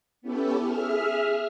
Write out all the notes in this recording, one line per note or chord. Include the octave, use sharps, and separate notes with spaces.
B3 C#4 E4 G4 A4
G#4 E5 F6